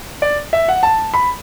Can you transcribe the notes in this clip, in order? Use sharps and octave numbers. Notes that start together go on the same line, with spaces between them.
D5
E5
F#5
A5
B5